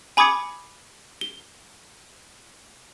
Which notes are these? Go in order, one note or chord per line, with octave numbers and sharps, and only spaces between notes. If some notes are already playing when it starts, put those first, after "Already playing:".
G#5 B5 D6 D#6 G#6 C#7
G7